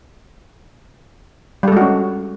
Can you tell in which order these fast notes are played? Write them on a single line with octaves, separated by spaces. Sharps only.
G3 A4 G#3 F#4 C#4